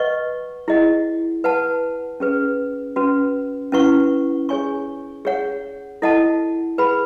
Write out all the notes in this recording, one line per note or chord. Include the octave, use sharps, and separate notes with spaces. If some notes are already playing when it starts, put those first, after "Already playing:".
Already playing: B4 D#5 F#5 C#6
E4 G#4 D#5 F#5
B4 F#5 A5
C#4 G#4 B4
C#4 F#4 B4
C#4 E4 B4 F#5 C#6
G#4 C#5 G#5 C#6
G#4 C#5 F#5
E4 A4 D#5 F#5 A5
G#4 B4 F#5 B5